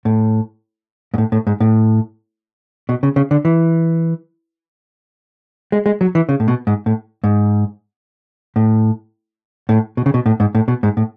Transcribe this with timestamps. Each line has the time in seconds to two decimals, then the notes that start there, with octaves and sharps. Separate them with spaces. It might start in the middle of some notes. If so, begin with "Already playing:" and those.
0.05 A2
1.14 G#2
1.18 A2
1.32 A2
1.47 G#2
1.60 A2
2.89 B2
3.03 C#3
3.16 C#3
3.31 D3
3.45 E3
5.72 G#3
5.86 G#3
6.01 F#3
6.15 E3
6.29 C#3
6.40 A2
6.48 B2
6.67 G#2
6.86 A2
7.24 G#2
8.56 A2
9.69 A2
9.97 B2
10.06 C#3
10.14 B2
10.26 A2
10.40 G#2
10.55 A2
10.68 B2
10.83 G#2
10.97 A2